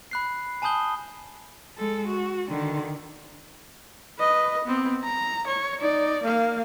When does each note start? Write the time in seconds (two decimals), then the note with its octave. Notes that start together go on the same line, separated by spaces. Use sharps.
0.11 B5 F#6 C7
0.62 G#5 A5 B5 D#6 G6 G7
1.77 G#3 A4
2.07 F#4
2.48 D3 D#3
4.19 B4 D#5
4.64 B3 C4
5.03 A#5
5.47 C#5
5.81 D#4 D5
6.23 A#3 F5